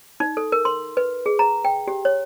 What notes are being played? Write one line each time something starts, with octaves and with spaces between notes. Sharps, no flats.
D#4
A4
A#4
C6
B4
G#4
A#5
G5
G4
C#5